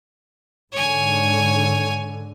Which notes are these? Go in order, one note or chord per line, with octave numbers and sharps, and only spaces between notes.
G#2 D3 C#5 G#5